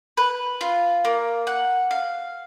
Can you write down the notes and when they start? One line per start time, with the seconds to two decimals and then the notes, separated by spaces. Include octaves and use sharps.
0.17 B4
0.61 F4
1.05 A#3
1.47 F#5
1.91 F5